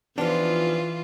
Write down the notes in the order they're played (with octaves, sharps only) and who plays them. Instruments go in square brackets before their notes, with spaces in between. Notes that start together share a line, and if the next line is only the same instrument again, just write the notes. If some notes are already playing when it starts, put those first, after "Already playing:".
[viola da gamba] E3 F4 [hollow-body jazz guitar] F3 D4 [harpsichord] B3 D#4 G4